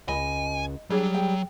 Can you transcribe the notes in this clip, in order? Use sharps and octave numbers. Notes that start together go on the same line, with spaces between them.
C#2 D#5 G#5 B5
F#3 G3 D4 G#4 C#5
G#4 G5